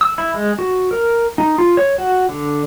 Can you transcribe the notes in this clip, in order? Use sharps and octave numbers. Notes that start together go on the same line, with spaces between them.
E6
E4
G#3
F#4
A#4
D#4
F4
C#5
F#4
D3